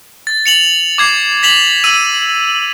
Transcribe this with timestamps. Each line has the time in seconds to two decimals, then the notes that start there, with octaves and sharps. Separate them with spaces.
0.27 A6
0.46 C#7 F7 F#7
0.98 D6 G#6 C7
1.43 A6 B6 F7 F#7
1.84 E6 D#7